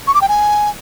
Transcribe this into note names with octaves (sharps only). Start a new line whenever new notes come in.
C#6
D6
G5
G#5